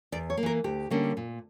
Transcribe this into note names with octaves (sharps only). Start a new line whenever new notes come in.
E2 D5
C#5
A#3
E3 A#4
D2 G4
D3 G3 A#3 C#4
A#2